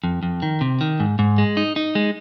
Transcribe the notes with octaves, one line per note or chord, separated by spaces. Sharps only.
F2
F2
D#3
C3
D#3
G#2
G#2
G#3
D#4
D#4
G#3